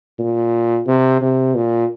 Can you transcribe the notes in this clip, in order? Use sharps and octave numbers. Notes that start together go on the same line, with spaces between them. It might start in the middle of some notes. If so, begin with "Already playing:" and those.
A#2
C3
C3
A#2